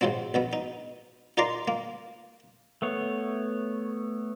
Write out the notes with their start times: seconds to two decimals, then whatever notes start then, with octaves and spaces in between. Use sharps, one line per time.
0.01 G#2 C3 F3 F#3 C4
0.34 A#1 B2 B3
0.53 D#4
1.37 D#4 F4 A#4 D5 A#5 C6
1.68 A#3
2.82 A3 B3 C#5